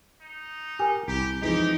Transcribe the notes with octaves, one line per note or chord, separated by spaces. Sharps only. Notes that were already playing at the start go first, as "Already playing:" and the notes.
D#4
G4 A#4 G#5
C2 G4 A#5
F2 E3 G#3 D#4 G4